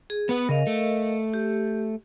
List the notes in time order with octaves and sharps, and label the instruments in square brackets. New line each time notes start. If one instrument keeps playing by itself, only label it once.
[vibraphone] G#4
[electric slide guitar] B3 B4 [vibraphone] B5
[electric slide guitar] C#3 [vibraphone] A#4 D#5 F5
[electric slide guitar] A3
[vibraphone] G4